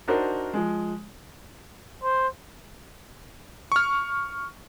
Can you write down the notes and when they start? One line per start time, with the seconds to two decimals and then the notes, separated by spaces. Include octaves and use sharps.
0.08 D4 D#4 F#4 A#4 C5
0.54 F3 G#3
2.03 C5
3.72 C#6 F6